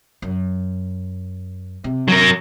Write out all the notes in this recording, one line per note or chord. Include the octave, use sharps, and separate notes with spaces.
F#2
C3
F#3 A#4